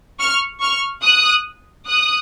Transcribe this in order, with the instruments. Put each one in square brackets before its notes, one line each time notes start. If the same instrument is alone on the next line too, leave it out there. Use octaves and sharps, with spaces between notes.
[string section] C#6 F6
C#6 F6
D#6 F#6
D#6 F#6